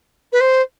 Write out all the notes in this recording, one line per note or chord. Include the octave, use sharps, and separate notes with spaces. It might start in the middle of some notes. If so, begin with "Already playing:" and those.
B4
C5